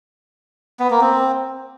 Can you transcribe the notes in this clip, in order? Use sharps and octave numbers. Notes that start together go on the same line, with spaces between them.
B3
A#3
C4